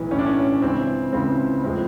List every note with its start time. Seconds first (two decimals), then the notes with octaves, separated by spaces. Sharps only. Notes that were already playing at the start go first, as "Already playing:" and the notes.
Already playing: B1 A2 E3
0.11 B1 A2 E3 C#4
0.19 D4
0.26 C#4
0.62 C#2 C#3 E3 C4
1.13 C#2 C#3 E3 C4
1.63 A2 F3 G#3 C4